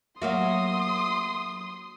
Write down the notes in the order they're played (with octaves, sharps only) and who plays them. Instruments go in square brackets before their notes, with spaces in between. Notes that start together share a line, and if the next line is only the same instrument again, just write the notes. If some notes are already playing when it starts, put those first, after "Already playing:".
[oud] F#3 A#3 F#4 [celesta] E5 F#5 [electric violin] C6 D#6